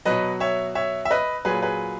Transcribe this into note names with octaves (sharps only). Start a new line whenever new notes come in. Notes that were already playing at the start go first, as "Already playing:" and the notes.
B2 F#3 B4 D#5
C#5 E5
C#5 E5
E5
B4 D#5
A#2 F#3 G#4 B4
G#4 B4